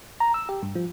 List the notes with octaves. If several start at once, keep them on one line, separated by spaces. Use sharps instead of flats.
A#5
E6
G4
G2
F3